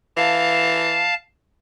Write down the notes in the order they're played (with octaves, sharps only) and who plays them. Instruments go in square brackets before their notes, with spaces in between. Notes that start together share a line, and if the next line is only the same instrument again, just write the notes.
[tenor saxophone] E3 [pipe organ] F5 A5